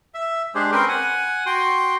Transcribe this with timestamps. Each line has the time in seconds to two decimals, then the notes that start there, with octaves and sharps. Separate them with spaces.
0.14 E5
0.55 G#3 D4 G4 G#4 C5
0.72 C4 C#4 A#4 B4 G5 C6
0.88 F#5 G#5
1.46 F#4 G5 C6